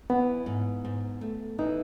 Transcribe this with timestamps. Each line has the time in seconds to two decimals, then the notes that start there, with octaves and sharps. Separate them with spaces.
0.10 E3 B3
0.46 G#2
0.85 G#2
1.21 A3
1.59 E3 D#4